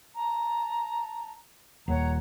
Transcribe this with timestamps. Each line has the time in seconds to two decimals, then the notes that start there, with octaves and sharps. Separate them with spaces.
0.15 A5 A#5
1.88 D#1 C#5 F#5 A#5